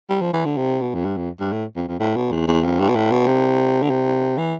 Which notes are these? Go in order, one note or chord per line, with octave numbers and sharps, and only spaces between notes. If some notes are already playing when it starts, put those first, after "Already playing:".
G3
F3
E3
D3
C3
B2
F2
G2
F2
G2
A2
F2
F2
A2
B2
E2
E2
F2
G2
B2
A2
B2
C3
D3
C3
E3